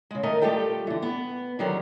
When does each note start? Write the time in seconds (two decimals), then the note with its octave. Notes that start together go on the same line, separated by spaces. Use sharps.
0.11 C#3 G#3
0.23 D#3 A3 A#4 D#5
0.41 G3 A3 F4 G4 A4 G5
0.87 D3 E3
1.02 B3
1.59 D3 D#3 F#3 G3